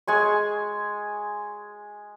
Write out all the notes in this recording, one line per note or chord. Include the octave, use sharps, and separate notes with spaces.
G#3 G#5 C#6